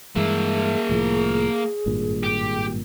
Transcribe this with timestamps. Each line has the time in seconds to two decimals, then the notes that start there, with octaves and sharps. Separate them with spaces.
0.16 G2 E3 G#3 A#3 G#4 E5
0.89 C2 A2 F3
1.86 G#1 G2 A#2
2.23 G4